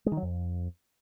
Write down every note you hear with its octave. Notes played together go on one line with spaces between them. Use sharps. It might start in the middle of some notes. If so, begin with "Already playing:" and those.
G#3
D#3
F#3
F2